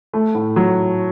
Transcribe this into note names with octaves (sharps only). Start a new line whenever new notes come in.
A3
A2
F#3